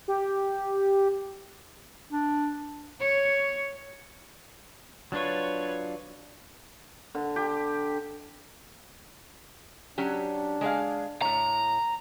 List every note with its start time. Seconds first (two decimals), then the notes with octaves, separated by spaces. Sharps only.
0.08 G4
2.11 D4
3.00 C#5
5.12 F#3 D4 F4 B4 C#5
7.15 D3
7.36 G4
9.98 F#3 C#4 D4 G4
10.61 G#3 G#4 F5
11.22 A2 C#5 A#5